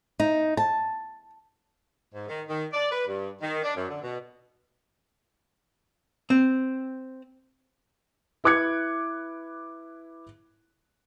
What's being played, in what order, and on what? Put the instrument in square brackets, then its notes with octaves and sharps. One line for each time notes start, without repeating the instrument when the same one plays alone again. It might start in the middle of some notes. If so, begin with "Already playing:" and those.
[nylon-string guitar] D#4
A5
[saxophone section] G#2
D#3
D#3
D5
B4
G2
D#3
D4
F#2
D3
B2
[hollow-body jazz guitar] C4
[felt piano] E4 B4 D6 F#6 G#6 C#7